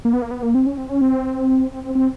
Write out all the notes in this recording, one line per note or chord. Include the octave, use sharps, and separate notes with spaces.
A#3
B3
A#3
B3
A#3
C4
C#4
C4
C#4
C4
C4
C4
C4